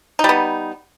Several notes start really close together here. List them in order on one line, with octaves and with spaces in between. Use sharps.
D#4 G3 B3